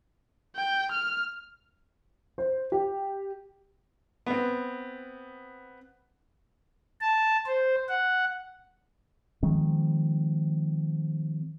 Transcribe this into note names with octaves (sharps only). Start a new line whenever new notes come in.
G5
F6
C5
G4
B3 C4
A5
C5
F#5
D#3 F3 G#3 C4